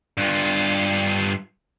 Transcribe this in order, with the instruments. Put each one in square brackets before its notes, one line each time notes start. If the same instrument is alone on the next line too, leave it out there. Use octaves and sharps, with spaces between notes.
[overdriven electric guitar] G2 F4